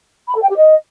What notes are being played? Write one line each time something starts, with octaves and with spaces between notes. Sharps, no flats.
B5
A4
G5
G4
D#5